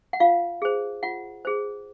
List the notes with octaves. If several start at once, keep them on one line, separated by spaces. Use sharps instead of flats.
F#5
F4 F5
G#4 C5
F4 F#5
G#4 C5